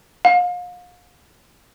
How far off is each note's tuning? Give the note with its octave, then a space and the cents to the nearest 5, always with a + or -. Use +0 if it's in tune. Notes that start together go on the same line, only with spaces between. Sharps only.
F5 +35